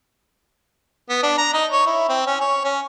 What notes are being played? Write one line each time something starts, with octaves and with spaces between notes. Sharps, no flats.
B3
D4
A#5
D#4
C#5
E4
C4
C#4
C#5
C#4